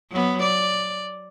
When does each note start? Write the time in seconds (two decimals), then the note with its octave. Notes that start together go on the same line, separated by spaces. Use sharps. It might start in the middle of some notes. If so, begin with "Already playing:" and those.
0.12 F#3 B3
0.42 D5